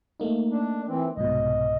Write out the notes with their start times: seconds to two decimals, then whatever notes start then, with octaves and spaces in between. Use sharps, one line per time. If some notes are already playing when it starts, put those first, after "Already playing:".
0.20 A3 A#3 D#4
0.51 D4
0.87 E3 C4
1.17 C2 G#2 B2 D#5